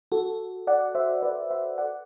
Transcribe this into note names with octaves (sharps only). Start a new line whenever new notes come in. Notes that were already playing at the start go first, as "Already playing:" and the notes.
F#4 A4
D5 F#5
C5 E5
B4 D5
C5 E5
D5 F#5